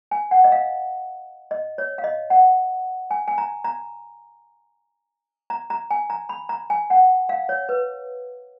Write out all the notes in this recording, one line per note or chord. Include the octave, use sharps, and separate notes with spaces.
G#5
F#5
D#5
F5
D#5
C#5
F5
D#5
F#5
G#5
G#5
A#5
A#5
A#5
A#5
G#5
A#5
B5
A#5
G#5
F#5
F5
C#5
B4